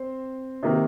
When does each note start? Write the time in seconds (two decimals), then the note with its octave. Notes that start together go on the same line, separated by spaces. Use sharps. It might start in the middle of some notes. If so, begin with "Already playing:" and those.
Already playing: C4 C5
0.63 C3 D#3 A#3